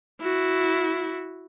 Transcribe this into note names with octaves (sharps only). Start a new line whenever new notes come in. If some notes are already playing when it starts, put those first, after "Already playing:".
E4 F#4